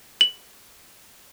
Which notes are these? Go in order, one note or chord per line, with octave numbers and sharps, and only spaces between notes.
F#7